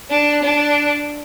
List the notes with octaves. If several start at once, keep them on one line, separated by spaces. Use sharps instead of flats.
D4
D4